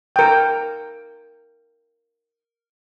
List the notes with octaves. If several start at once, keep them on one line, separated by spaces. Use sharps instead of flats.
A#4 G5